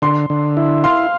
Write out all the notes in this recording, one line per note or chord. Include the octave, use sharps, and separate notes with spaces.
D3 C6
D3
E4
F5 C6